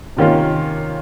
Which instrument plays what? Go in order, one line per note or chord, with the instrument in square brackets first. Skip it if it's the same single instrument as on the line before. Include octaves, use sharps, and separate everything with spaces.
[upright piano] C3 D#3 A#3 C#4 F4